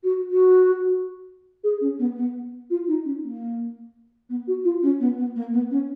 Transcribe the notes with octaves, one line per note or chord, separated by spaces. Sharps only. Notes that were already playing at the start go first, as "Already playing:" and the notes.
F#4
F#4
G#4
C#4
B3
B3
F4
D#4
C#4
A#3
B3
F#4
F4
C#4
B3
B3
A#3
B3
C#4